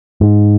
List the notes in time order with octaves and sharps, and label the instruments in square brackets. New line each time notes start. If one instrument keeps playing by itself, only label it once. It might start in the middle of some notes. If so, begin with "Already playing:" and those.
[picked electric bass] G#2